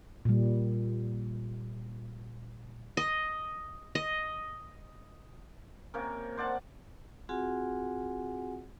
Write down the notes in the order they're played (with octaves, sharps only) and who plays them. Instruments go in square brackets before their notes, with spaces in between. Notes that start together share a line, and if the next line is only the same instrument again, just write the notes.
[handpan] A#2 G3
[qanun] D#5
D#5
[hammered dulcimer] C3 A#3 C#4 A#4
C5 D5 F#5 A5
[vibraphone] C4 F4 F#4 G#4 F#5 G#5